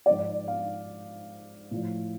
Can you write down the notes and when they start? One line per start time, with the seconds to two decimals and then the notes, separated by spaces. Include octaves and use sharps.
0.06 G#2 F3 D5
0.48 F5
1.71 A2 F3